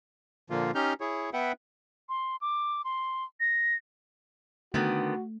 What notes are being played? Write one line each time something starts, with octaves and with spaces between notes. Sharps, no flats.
A#2 D3 F3 A#3 F4
C#4 D#4 G4 F6 G6
E4 G#4 C#5
B3 B4 E5 F#5 G5
C6
D6
C6
A#6
D3 D#3 A3 B3 F#4